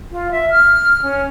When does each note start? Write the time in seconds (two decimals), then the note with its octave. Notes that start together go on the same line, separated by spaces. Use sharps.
0.11 F4
0.31 E5
0.50 F6
1.03 C#4